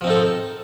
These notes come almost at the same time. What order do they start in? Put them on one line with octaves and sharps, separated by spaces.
F3 C4 D#4 A4